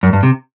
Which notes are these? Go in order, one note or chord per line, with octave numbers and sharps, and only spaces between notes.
F#2
G2
C3